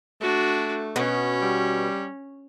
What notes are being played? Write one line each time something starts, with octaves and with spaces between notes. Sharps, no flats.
A3 D4 F#4
B2 C#4
G3